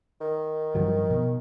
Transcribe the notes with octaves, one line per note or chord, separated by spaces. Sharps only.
D#3
G2 F3 F#3
B2